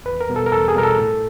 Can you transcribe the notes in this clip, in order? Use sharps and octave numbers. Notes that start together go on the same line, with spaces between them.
E2 B4
A#4
B2 G3 B3
A4
A#4
E2 A4
G#4
B2 G3 B3 A#4
A4
A2